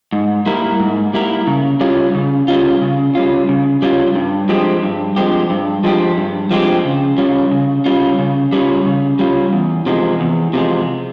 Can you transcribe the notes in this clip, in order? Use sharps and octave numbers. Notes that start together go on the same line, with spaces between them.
G#2
G3 A#3 E4 A#4
G#2
G3 A#3 E4 A#4
C#3
G3 C#4 F4
C#3
G3 C#4 F4
C#3
G3 C#4 F4
C#3
G3 C#4 F4
G2
F3 G#3 C4 G4
G2
F3 G#3 C4 G4
G2
F3 G#3 C4 G4
G2
F3 G#3 C4 G4
C#3
G3 C#4 F4
C#3
G3 C#4 F4
C#3
G3 C#4 F4
C#3
G3 C#4 F4
E2
C3 F3 G#3
E2
C3 F3 G#3